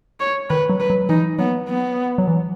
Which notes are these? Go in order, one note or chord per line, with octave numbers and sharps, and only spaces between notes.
C#5
D#3 B4
F#3
B4
F#3
E3 D#4
F#3 B3
B3
F#3
E3